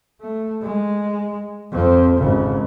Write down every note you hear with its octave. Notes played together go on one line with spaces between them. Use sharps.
A3
G#3
F2 C4
G#1 C#3